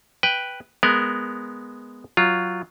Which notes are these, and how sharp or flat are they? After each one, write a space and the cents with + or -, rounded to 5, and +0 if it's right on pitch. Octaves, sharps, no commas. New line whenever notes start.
B4 +0 G5 +0
G#3 +5 B3 +0 A#4 +0
F#3 +0 F4 +0